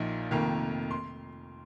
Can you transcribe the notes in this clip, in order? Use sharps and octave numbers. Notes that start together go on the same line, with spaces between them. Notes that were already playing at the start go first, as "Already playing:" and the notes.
Already playing: A#1 A#2 F3 D#4
F1 F2 D#3 A#3
C6